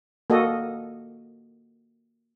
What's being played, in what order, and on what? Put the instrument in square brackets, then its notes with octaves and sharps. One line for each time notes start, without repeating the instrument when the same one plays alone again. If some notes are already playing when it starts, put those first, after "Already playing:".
[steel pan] A#3 F#4 A4 D#5